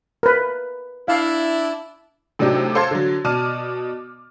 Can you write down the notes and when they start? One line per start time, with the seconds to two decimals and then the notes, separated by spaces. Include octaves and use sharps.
0.23 A#4 B4
1.08 D4 E4 F5
2.39 A2 C3 F#3 D4 D#4 G4
2.75 A4 C5 F5 C6 G#6 A6
2.91 D3 F#3
3.24 B2 D5 A5 D6 F6 D#7